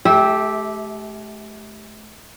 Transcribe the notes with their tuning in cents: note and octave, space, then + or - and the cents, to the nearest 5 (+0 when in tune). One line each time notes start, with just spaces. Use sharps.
A3 -35 G4 +0 E5 -10